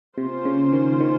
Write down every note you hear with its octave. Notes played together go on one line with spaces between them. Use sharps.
C3 A#3 C#4 F4 C5
C#3
D#3
D#3